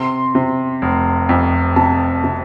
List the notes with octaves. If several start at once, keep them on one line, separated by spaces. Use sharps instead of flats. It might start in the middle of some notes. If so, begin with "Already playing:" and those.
Already playing: C3 C6
C3
F1
F2
C3 A5
C3